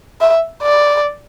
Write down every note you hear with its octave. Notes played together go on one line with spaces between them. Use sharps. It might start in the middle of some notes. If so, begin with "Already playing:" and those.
E5
D5